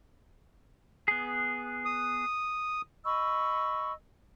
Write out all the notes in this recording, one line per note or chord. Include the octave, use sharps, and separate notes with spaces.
B3 G#4
D#6
D#5 B5 C#6 E6